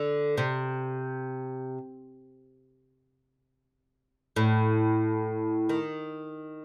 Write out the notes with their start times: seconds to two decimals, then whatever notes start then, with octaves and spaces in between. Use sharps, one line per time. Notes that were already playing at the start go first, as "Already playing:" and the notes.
Already playing: D3
0.37 C3
4.36 A2
5.69 D#3